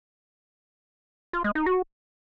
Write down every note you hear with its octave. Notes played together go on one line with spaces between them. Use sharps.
F4
G#3
D#4
F#4